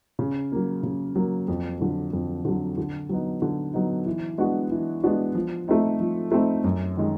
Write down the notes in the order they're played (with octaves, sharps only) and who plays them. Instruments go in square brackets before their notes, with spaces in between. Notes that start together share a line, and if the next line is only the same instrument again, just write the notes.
[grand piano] C#3
F#3 A#3
C#3
F#3 A#3
F2
D3 F#3
F2
D3 F#3
D3
F#3 B3 D#4
D3
F#3 B3 D#4
E3
G#3 B3 D4 F#4
E3
G#3 B3 D4 F#4
F3
A3 C4 D#4
F3
A3 C4 D#4
F#2
D#3 G#3